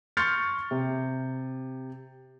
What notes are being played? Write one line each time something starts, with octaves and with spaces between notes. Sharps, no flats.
C6 C#6 F6 G6 A6 C#7
C3